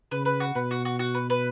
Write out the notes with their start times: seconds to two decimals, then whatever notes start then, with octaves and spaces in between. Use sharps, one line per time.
0.11 C#3 B4
0.25 B4
0.40 F#4
0.55 B2 B4
0.71 F#4
0.85 F#4
0.99 F#4
1.15 B4
1.30 B4